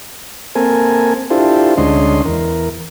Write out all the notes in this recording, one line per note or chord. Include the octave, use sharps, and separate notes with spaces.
A#3 C4 A4 A#4 G#5
D4 E4 F4 G4 A4 C5
D2 G#3 C#4 D4 D#5 C6
E2 A#4